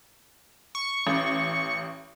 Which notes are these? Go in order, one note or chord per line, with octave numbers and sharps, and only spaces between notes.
C#6
A1